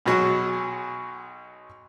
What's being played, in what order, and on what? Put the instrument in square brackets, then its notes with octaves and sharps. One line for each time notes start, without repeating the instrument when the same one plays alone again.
[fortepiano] B1 B2 F#3 G#4